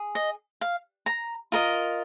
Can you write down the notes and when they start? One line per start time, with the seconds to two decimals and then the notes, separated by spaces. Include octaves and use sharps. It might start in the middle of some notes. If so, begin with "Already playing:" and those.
Already playing: G#4
0.15 D#5
0.61 F5
1.06 A#5
1.52 F4 A#4 D#5